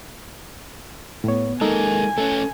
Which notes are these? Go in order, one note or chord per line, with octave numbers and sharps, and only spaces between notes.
A2 B3 C#5
G#3 A#3 D#4 A4 G#5
A3 C#4 A4